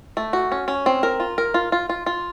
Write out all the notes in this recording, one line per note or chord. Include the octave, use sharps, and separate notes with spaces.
A3
F#4
C#4
C#4
C4
A#4
F4
A#4
F4
F4
F4
F4